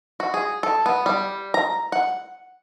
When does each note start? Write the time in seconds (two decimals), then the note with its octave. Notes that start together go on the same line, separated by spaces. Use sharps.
0.20 F#4
0.34 G#4
0.63 A4
0.86 B3
1.06 G3
1.54 A#5
1.92 F#5